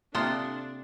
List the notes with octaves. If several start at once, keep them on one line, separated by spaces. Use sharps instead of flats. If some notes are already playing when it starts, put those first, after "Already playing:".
C3 A#3 D4 F4 A4 C6 D#6